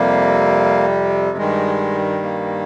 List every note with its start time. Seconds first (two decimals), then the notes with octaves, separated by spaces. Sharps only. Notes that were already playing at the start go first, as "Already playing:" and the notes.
Already playing: F2 C3 G3 A#3
1.37 G2 D#3 G3 G#3
2.22 A#3